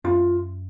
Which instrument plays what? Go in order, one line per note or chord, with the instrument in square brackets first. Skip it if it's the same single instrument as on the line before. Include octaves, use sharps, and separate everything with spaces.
[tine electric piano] F#2 [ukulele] F4